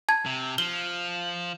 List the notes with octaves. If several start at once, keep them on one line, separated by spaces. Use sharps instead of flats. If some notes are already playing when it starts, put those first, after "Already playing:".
A5 G#6
C3
F3 G7